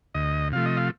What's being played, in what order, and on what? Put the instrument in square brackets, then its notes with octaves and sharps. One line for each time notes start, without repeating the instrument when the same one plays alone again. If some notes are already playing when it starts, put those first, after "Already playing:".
[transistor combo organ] D2 D#5
C3 F3 A3 F5
D#5
F5